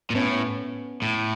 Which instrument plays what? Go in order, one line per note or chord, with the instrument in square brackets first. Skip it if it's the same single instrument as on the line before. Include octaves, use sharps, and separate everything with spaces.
[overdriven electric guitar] A#2
[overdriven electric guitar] A2 [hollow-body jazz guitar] B3 C#4
[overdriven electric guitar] A2